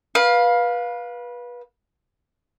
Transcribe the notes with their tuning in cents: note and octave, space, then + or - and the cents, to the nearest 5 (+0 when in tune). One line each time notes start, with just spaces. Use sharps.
B4 -25 F5 +15